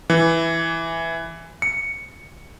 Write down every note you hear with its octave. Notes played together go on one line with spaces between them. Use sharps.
E3
C#7